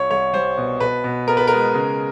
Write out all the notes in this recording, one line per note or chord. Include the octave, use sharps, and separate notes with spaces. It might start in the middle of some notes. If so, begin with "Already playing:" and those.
Already playing: C2 C#5
C2 C#5
G3 C5
B2
B2 B4
B2
B3 A#4
B4
G#3 A#4
C#3